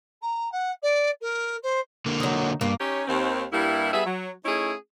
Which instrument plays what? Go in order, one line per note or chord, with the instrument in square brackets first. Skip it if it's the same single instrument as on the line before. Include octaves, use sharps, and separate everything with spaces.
[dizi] A#5
F#5
D5
A#4
C5
[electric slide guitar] D3 A#3
[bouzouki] F#3 D#4
[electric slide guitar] G2 [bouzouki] A#3
[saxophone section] C#4 D#4 G4 C#5
D#2 C4
G2 G3 A#3 E4
G3 B3 G#4 E5
F#3
A3 C#4 D#4 E4 G#4